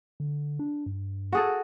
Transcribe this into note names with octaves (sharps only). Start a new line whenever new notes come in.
D3
D4
G2
F#4 G#4 A4